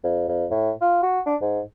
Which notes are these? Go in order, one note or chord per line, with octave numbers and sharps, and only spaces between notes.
F2
F2
A2
F4
F#4
D4
G#2